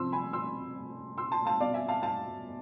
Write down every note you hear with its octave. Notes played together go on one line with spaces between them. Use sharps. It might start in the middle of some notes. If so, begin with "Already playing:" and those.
Already playing: C3 F3 C6 E6
G#5 B5
C6 E6
C6 E6
A5 C6
F5 A5
B2 D5 F5
E5 G#5
F5 A5
F5 A5